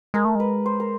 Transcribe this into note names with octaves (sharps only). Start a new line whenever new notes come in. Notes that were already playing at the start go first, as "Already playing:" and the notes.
G#3 A#4
A3
G#3 B4
C5
A#4